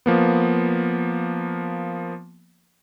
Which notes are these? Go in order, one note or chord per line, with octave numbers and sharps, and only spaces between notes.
F3 A#3 B3